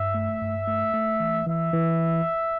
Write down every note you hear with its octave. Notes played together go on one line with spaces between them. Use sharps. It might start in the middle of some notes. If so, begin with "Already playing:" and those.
Already playing: G2 E5
A3
G2
A3
A3
E3
E3 E5
E3